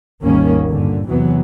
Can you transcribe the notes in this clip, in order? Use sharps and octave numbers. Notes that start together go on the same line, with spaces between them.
G#1 D#2 D#3 G3 A#3 C#4
G2 A#2 D3
E2 C3 E3 F#3 B3